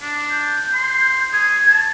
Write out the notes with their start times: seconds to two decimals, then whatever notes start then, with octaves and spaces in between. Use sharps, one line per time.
0.02 D4
0.30 G6
0.74 C6
1.33 G#4 G#6
1.68 A5